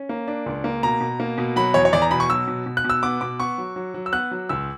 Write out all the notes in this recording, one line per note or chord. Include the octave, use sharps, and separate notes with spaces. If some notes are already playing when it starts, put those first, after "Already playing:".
Already playing: C#4
A#3
D4
C#2
A#3
B2 A#5
B2
A#3
B2
F#3 B5
E2 C#5
C#5
E2 D5
A#5
B2 B5
C#6
F#3 E6
B2
B2
F#6
B2
E6
B3 D6
B2 D6
B3 C#6
F#3
F#3
F#3
E6
B3 F#6
F#3
C#2 E6